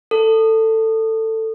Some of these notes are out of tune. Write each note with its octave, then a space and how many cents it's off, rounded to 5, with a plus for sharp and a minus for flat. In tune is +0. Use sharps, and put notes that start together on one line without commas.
A4 +15